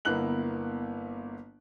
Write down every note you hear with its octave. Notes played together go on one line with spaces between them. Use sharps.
G1 A#3 B3 E4 F#6 F#7